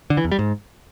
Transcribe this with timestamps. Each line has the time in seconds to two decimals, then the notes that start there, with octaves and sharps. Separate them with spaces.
0.10 D3
0.17 E3
0.24 E2
0.32 G3
0.39 G#2